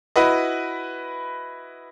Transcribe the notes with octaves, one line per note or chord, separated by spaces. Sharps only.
E4 F#4 B4 D#5